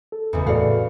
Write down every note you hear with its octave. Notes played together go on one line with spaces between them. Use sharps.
A4
F#1 E2
A2 F#4 A4 D5 F5